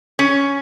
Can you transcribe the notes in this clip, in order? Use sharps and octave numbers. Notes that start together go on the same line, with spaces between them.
C#4